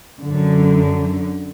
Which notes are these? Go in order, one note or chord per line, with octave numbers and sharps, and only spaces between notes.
F#2 D3